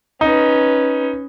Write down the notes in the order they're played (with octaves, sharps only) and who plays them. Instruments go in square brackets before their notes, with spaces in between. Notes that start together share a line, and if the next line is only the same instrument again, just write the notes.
[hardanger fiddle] C#4 B4 [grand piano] D#4